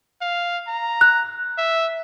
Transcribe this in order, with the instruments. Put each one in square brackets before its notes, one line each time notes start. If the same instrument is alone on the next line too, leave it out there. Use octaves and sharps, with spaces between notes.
[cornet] F5
A#5
[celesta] F#6
[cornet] E5